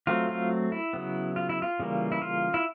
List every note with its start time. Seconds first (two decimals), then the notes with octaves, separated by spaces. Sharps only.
0.07 F#3 A3 C4 F4
0.29 F4
0.72 E4
0.93 C#3 F#3 B3
1.36 F4
1.49 E4
1.62 F4
1.80 C#3 E3 G3 A#3
2.12 E4
2.22 F4
2.54 E4